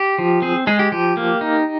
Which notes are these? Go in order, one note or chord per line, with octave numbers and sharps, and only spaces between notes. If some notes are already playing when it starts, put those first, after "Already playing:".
Already playing: G4
F3
C4 G#4
G#3 G#4
G4
F3 G4
A#3
D#4